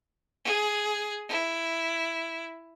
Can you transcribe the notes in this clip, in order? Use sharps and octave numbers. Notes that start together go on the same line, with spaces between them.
G#4
E4